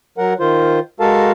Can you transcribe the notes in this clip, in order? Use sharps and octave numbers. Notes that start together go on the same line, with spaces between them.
F#3 A#4 F#5
D#3 F4 C5
G#3 F#4 A4 A#4 F5 A5